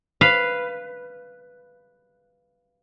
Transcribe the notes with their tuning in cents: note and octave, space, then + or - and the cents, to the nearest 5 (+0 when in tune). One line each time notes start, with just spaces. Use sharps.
B4 +0 F5 -10